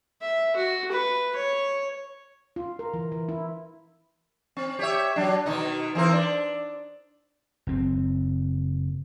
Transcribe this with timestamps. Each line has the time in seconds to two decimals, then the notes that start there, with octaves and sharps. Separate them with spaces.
0.22 E5
0.56 F#4
0.92 B4
1.36 C#5
2.56 F4
2.79 A#4
2.93 E3
3.12 E3
3.29 E4
4.57 C4
4.79 G4 C#5 E5
5.16 F#3 D4
5.46 B2 D#3 D#4
5.95 E3 C4 A#4
6.12 D4
7.67 F#1 C4